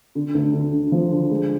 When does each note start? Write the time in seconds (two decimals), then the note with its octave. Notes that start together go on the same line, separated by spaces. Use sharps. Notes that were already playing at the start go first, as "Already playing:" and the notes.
0.15 D3
0.34 D2
0.53 D3
0.72 D3
0.92 F3
1.11 D3
1.30 G#3